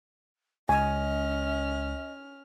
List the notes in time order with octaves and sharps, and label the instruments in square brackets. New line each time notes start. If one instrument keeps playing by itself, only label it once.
[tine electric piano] C#2 [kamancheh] C#4 F6 [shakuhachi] D#5 [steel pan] G#5